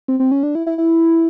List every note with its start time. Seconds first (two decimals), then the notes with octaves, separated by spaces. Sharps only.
0.08 C4
0.20 C4
0.32 C#4
0.43 D4
0.55 E4
0.66 E4
0.78 E4